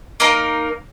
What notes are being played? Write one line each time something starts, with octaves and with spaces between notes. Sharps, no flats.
A#3 D#4 A#4